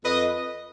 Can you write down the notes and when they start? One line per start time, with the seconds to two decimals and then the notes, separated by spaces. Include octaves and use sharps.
0.05 F2 B4 D#5